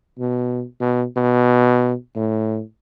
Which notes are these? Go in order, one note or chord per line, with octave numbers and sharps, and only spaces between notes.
B2
B2
B2
A2